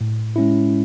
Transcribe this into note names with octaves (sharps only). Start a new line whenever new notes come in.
A2
G#3 C#4 E4